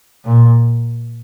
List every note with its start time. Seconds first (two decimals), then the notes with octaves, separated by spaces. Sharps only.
0.25 A#2